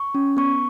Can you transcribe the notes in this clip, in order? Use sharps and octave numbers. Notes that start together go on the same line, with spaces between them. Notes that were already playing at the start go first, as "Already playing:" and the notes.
Already playing: C#6
C#4
B3 C#6